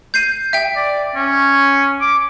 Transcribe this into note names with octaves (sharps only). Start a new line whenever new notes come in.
G6 C7 D#7
E5 G5
D5
C#4
D6